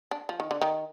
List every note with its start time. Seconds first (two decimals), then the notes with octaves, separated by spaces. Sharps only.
0.11 D4
0.29 F3
0.40 D#3
0.51 D3
0.61 D#3